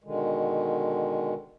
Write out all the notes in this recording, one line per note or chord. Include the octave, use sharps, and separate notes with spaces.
B2 D3 D#3 G#3